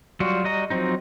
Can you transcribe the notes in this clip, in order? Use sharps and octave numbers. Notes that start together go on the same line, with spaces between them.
F#3 G3 F4 F#4
G3 F#4 D#5 A#5
F3 F#3 C4 D#4